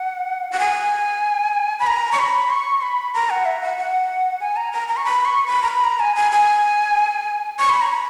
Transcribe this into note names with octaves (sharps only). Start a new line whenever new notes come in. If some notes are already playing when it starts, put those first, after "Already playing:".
Already playing: F#5
F#5
G#5
B5
A#5
C#6
B5
C#6
B5
A#5
F#5
E5
F#5
F#5
G#5
A#5
A#5
A#5
C#6
B5
C#6
B5
A#5
B5
A#5
G#5
G#5
G#5
C#6
B5
A#5
B5